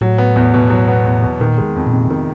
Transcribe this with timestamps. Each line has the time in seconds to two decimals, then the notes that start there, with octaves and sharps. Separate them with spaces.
0.01 A2 F#3
0.18 B3
0.36 E2
0.54 B2
0.70 F#3
0.88 B3
1.05 E2
1.22 B2
1.40 A#2 D#3
1.58 G#3
1.76 F2
1.87 A#2
1.93 C3
2.10 D#3